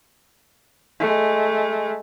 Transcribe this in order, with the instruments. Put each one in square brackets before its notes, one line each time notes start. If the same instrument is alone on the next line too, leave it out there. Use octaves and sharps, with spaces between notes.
[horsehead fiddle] G#3 A3